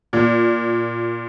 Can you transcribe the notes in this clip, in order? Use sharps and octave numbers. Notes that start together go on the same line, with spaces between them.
A#2